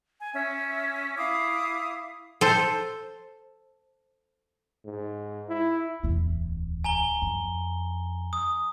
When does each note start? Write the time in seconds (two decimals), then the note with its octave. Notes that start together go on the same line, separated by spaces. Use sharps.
0.20 G#5
0.34 C#4 E5
1.17 E4 F5 D6 D#6
2.41 A4 C5
4.85 G#2
5.49 E4
6.03 D1 E2
6.84 G#5 A#5 G7
7.22 F2
8.33 D#6